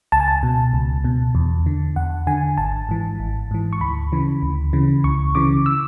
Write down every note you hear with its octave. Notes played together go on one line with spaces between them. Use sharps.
C#2 A5
G#5
A5
B2
C#2
B2
E2
D3
E2 F#5
D3 G#5
G#1 A5
G#2 E3
G#1
G#2 E3
C#6
D2 B5
C#3 E3
D2
C#3 E3
C#2 C#6
C#3 E3 D6
E6